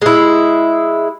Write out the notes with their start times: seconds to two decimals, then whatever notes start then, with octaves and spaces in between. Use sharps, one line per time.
0.01 G#3 E4